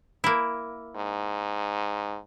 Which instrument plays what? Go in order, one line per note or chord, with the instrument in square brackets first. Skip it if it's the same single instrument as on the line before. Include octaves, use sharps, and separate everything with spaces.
[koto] A#3 E4
[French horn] G#2